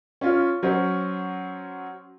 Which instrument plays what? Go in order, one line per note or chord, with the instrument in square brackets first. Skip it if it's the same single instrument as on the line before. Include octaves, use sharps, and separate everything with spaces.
[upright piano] C#4 F4
F#3 C#4 C5